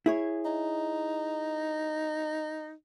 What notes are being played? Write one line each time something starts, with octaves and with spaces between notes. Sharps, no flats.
E4 G#4 C#5
D#4